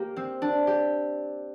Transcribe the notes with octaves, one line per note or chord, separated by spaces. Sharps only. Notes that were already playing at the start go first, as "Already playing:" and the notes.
Already playing: A#3 G4
C4
D4
G4